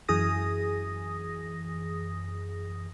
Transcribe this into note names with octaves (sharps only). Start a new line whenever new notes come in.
F#2 E3 G#4 D#6 A#6